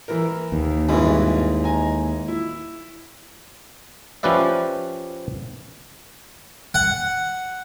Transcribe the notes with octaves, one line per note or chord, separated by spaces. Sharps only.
E3 A#4
D#2
G#1 G2 E3 G#3 B5
D#5 G#5 A#5
E4
F3 C#4 G4 B4 D5 E5
F#5